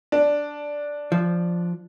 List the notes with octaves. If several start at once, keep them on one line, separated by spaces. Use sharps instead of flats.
D4
F3